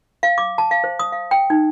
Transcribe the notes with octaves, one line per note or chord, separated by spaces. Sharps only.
F5
D6
A5
F5
C5
D#6
F5
G5
D#4